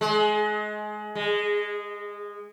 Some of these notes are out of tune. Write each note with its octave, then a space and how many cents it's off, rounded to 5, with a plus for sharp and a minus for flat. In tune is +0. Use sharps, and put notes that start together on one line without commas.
G#3 +25
G#3 -20